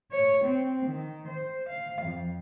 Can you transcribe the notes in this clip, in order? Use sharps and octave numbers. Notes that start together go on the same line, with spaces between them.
C#5
C4
D#3
C5
F5
F2